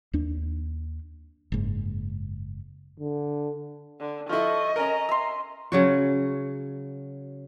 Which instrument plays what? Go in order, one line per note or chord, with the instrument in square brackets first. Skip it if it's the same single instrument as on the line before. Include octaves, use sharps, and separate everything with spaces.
[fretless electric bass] D#2 D4
F#1 G#2
[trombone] D3
[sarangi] D3
[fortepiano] F3 E4 [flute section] A4 C#6 [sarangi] D#5
[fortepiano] C#4 A#4 [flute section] A#5
[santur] E5 C6
[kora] C#3 F#3 F#4